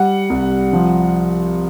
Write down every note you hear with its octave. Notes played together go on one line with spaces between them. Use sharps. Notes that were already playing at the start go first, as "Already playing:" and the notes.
Already playing: G3 F#5
C2
F3